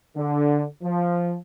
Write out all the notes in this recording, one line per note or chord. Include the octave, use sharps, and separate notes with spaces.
D3
F3